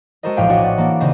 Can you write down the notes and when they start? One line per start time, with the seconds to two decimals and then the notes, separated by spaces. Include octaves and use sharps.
0.23 G#3 F#4 A4 A#4 C5 D#5
0.37 E1 A#1 A2 F5 G5
0.49 D4 F#4 C#5 D#5
0.64 F#5 A6
0.77 E3 A#3 D4
1.00 D#1 C#3 C4 D#5 A#6